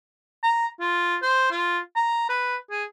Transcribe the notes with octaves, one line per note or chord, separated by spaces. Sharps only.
A#5
F4
C5
F4
A#5
B4
G#4